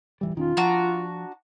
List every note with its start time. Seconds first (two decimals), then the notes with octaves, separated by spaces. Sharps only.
0.21 D#1 E3 G3
0.35 E1 D#3 C#4 F4
0.57 F3 D4 F#4 A#5